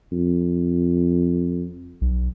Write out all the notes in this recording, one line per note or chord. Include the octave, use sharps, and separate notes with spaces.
F2
B1